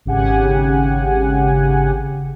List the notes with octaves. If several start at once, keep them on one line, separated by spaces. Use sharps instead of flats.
G#1 C#3 G4 F#5 G#5